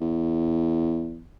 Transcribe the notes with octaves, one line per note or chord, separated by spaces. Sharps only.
E2